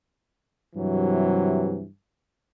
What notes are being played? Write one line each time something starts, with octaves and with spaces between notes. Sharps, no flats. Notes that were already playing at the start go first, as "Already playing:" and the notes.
G2 C3 E3 F#3